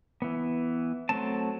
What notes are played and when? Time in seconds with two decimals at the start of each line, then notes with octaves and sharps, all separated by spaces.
0.22 E3 B3
1.09 F#3 A3 C4 A5